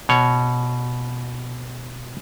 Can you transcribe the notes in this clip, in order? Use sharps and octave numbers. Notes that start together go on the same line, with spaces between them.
B2 C#5